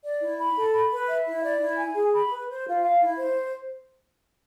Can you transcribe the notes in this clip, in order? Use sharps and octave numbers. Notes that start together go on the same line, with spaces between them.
D5
E4
B5
A4
B5
B4
E5
E4
D5
E4
G#5
G#4
B5
B4
C5
F4
F5
E4
C5